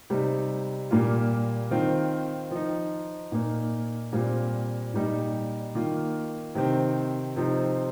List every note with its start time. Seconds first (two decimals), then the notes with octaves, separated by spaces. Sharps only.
0.10 C3 G3 D#4
0.91 A#2 G3 A#3 F4
1.71 D#3 C4 F4
2.51 F3 D#4
3.32 A#2 A#3 D#4
4.13 A#2 G3 C4 F4
4.94 A#2 G3 D#4
5.75 D#3 A#3 F4
6.55 C3 D#3 C4
7.36 C3 F3 C4 D#4